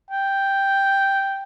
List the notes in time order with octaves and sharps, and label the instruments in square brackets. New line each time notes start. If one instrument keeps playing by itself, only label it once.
[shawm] G5